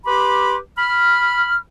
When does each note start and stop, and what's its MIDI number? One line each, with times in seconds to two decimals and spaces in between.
0.06 0.57 67
0.06 0.57 71
0.06 0.57 83
0.06 0.57 84
0.06 0.57 86
0.78 1.57 83
0.78 1.57 89